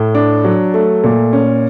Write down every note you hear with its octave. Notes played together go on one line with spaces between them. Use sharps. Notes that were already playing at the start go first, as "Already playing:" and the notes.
Already playing: A2
D4
F#3
A3
A#2
C#4